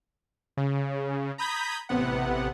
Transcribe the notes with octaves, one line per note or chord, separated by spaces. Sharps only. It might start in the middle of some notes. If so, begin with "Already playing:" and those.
C#3
A#5 B5 D#6 G6 G#6 B6
A1 C3 B3 F#5